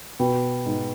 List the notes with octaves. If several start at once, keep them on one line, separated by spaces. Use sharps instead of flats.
B2 B4 G5 B5
G#2